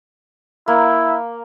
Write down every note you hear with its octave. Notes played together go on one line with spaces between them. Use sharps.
A#3 E4